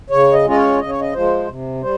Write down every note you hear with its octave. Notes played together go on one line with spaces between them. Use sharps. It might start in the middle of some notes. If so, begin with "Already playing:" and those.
C#3 C#5
D#5
G#3 C#4 F4 D#5
C#5
C#3 D#5
C#5
D#5
F3 G#3 C5
C3
G3 C5